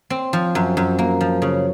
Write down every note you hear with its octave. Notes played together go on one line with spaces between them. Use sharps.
C4
F3
F#2
F#2
A#3
F3
C#3